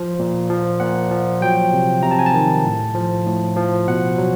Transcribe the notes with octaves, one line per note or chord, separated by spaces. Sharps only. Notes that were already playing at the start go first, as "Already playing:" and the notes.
Already playing: F3
A#2
F3
A#2 F#5
F3
F#3 G5
C3
C3 A#5
A5
G#5
A5
D#3
A2
F3
A2
F3
B2 F#5
F#3